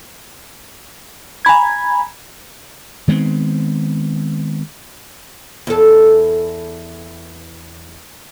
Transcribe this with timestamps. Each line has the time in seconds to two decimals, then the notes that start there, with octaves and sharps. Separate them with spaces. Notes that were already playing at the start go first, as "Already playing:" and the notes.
1.45 G#5 A#5 B5 G#6
3.08 D#3 G#3 B3 C4
5.67 E2 A4